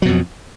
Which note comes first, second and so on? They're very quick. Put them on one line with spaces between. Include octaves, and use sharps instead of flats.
F#3 B2 F2